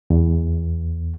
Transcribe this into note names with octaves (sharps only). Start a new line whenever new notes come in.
E2